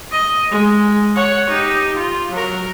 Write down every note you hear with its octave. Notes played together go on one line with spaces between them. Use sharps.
D#5
G#3
C#5 F#5
D#4 G4
F4
F#3 A#4